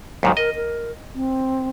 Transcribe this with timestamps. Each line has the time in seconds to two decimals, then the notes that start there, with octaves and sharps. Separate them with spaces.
0.23 D#2 G#2 D#3 F#3
0.37 A#4 D#5
0.55 A#4
1.15 C4